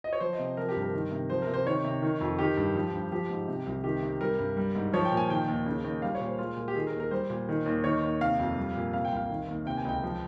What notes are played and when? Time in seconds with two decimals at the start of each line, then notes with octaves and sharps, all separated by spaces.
0.04 D#5
0.13 C#5
0.20 F3 C5
0.33 D#5
0.39 C3
0.57 F3 A#4
0.69 G4
0.76 G2
0.82 A#4
0.94 D#3
1.12 C3
1.30 F3 C5
1.42 A#4
1.48 C3
1.54 C5
1.66 D#3 C#5
1.84 C3
2.02 D#3
2.21 F2
2.39 D#3 G4
2.57 G2
2.75 F3
2.94 G2
3.12 F3 G4
3.30 G#2
3.48 C3
3.66 C2
3.84 D#3 G4
4.03 C3
4.21 G3 A#4
4.39 G2
4.57 G3
4.75 G#2
4.93 F3 C#5
5.05 G5
5.12 A#2
5.17 G#5
5.29 D#3 G5
5.48 D#2
5.66 C#3
5.84 D#2
6.02 G3 F5
6.15 C#5
6.21 A#2
6.27 C5
6.38 G#3 F4
6.57 A#2
6.68 G4
6.75 D#3 G#4
6.87 A#4
6.94 D#2
7.00 A#4
7.11 G3 C5
7.30 A#2
7.49 D#3
7.66 D#2
7.84 D#3 C#5
8.02 D#2
8.21 C3 F5
8.40 F2
8.57 G3
8.75 A#2
8.93 C3 F5
9.05 G5
9.12 C2 F5
9.30 D#3
9.48 D#2
9.66 C3 G5
9.77 G#5
9.85 C#2 G5
10.03 F3